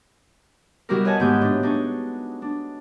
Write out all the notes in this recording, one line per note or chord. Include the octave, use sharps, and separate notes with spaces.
B2 G3 E4 F#4 G4 A#4
B4 C#5 D#5 F#5 G#5 A5
G#2 D#3 B3 G4 G6
A2 B3 D4
D4 D#4 G#4 C#6
D4